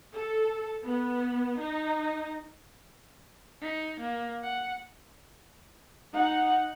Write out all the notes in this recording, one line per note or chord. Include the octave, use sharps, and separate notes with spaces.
A4
B3
D#4
D#4
A#3
F#5
D#4 F#5